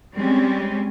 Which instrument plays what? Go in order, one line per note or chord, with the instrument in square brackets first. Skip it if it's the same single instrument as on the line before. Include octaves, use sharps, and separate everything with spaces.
[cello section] G3 G#3 C4 C#4